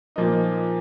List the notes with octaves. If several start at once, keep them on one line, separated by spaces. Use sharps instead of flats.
A#2 F3 A#3 D#4